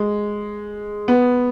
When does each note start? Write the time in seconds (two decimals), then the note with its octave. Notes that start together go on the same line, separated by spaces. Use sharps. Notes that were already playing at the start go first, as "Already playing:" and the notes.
Already playing: G#3
1.08 B3